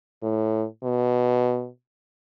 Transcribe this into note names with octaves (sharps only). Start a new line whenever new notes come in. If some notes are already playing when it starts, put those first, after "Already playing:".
A2
B2